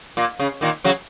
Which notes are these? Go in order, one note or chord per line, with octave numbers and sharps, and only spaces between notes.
A#2
C#3
A#2 D#3
C#3 F#3